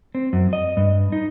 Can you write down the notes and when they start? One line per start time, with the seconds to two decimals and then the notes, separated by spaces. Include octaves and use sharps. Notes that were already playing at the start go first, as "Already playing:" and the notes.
0.15 C4
0.33 F#2
0.53 D#5
0.77 G2
1.12 D#4